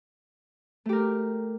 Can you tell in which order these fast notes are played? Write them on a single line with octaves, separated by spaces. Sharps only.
A3 G4 A#4